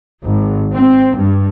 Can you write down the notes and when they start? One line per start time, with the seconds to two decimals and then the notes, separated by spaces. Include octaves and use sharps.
0.23 G#1
0.74 C4
1.15 G2